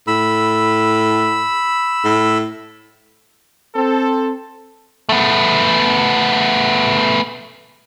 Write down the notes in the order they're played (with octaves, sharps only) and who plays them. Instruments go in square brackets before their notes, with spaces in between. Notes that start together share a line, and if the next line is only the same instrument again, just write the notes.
[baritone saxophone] A2 [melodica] B5 E6
[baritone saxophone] A2
[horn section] C4 A4
[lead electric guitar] A3 B3